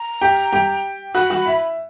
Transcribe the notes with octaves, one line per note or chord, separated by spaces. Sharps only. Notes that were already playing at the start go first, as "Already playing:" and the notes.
Already playing: A#5
G4 G5
G4 G5
F#4 F#5 B5
F#4 F#5
E4 E5